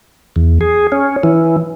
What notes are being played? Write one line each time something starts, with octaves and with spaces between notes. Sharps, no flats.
E2
G#4
C#4
E3